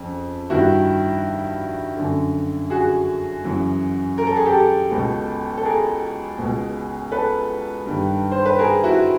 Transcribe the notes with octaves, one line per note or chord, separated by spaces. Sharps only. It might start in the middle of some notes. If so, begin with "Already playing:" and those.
Already playing: F2 C#3
G2 D#3 E4 F#4
F#2 D3
F#4 G#4
F#2 C#3 E3
A#4
A4
G#4
G4 A4
C#2 B2
A4
G#4 A#4
C#2 B2
A4 B4
G2 D#3
C5
B4
G#4 A#4
E4 F#4